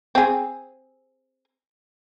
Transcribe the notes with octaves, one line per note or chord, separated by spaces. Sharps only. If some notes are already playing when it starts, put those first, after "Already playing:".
C4 G#4